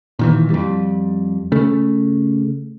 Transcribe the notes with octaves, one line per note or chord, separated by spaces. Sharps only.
A#2 D#3 E3
F2 G3
C#3 A3